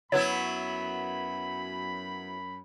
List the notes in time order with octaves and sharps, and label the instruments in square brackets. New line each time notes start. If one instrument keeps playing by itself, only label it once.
[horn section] F#2 B5 [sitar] F#3 B3 E4 [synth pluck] C#5